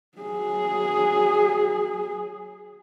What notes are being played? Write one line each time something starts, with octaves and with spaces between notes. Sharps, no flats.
F#3 G#4